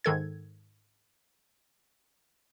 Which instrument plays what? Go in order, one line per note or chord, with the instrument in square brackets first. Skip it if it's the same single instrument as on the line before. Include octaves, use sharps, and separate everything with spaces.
[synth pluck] G#2 D#3 A4 G#6